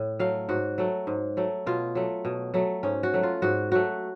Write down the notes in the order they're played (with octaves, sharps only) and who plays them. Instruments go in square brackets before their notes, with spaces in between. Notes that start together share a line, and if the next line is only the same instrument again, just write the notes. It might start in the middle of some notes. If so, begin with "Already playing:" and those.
Already playing: [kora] A2
F#3 A3 F5
G#2 F#4
F#3 A3
G#2
F#3 A3
B2 F4
F#3 A3
B2
F#3 A3
G#2 C#4
F#4
F#3 A3
F4
G#2 F#4
F#3 A3 F#4